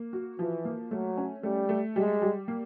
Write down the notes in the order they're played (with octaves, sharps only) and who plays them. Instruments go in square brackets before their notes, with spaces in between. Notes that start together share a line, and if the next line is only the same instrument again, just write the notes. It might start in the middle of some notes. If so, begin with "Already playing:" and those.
Already playing: [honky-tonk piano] A#3
F#4
[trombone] E3 [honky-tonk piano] F3
[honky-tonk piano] A#3
[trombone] F#3 [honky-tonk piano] A3
[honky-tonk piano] C#4
[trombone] G3 [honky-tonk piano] A3
[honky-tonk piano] A3
[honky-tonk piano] G3 [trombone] G#3
[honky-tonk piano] G3
A#3